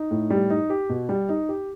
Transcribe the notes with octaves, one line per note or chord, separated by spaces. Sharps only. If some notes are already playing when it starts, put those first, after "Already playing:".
Already playing: D#4
A2
G3
D#4
G4
B2
G3
D#4
G4